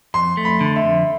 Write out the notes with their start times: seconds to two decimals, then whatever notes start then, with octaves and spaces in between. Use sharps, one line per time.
0.14 F2 C6
0.37 A3
0.45 B5
0.61 D3
0.76 E5
0.83 F2